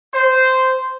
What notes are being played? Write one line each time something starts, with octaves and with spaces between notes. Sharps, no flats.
C5